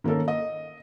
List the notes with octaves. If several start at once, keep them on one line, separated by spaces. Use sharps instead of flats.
D#3 A#3 C#4 A4 A#4
D#5